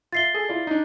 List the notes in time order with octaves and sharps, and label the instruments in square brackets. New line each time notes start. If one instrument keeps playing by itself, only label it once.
[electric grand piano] F4 E5 [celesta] A6 C7 G7
[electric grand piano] G#4 A4
E4 F4 D5
D4 D#4